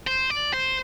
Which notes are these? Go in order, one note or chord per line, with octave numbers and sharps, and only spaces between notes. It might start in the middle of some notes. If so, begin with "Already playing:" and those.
C5
D5
C5